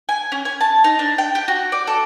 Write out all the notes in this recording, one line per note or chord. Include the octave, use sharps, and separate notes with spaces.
G#5
C#4
G#5
A5
D#4
D4
G5
G4
F#4
D5
A4